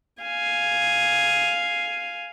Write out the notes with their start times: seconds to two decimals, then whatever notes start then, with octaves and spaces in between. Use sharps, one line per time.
0.23 F5 G#5